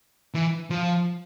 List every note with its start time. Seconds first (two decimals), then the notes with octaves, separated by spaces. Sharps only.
0.34 E3
0.70 F3